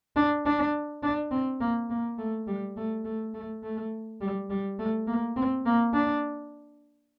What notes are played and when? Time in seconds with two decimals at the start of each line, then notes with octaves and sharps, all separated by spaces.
0.16 D4
0.45 D4
1.03 D4
1.31 C4
1.60 A#3
1.90 A#3
2.18 A3
2.47 G3
2.76 A3
3.05 A3
3.34 A3
3.63 A3
4.21 G3
4.50 G3
4.79 A3
5.08 A#3
5.36 C4
5.66 A#3
5.94 D4